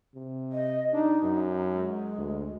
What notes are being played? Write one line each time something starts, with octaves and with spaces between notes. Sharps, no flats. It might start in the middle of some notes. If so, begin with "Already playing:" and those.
C3
D#5
D4 D#4
F#2
G#3
D2